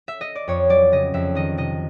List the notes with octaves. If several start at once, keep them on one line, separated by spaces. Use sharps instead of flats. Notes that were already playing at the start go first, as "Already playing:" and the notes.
E5
D#5
D5
F2 C#5
F#3 D5
C#3 D#5
F2 E5
D#3 D#5
C3 D#5